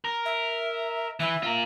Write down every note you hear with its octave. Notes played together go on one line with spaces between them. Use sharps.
A#4
E5
E3 E4 E5
F4 A#4